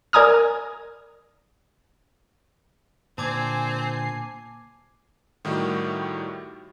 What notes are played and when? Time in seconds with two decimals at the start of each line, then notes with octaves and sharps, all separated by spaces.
0.13 A#4 D5 G#5 A#5 D#6 F6
3.18 A#2 D3 C4 G#5 A5 D6 G#6 C7
5.45 A2 D#3 G3 F#4 G4